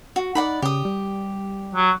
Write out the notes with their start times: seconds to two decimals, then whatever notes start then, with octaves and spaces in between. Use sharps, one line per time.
0.16 F#4
0.35 D#4 D5 F#5 B5
0.62 C#3 G4 D#6
0.85 G3
1.74 F#3